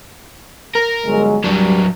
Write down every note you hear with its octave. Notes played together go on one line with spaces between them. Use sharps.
A#4
G1 F#3 G#3
F#3 G3 D4